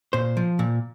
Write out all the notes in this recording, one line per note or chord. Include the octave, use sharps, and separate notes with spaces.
A#2 C5
F3
A#2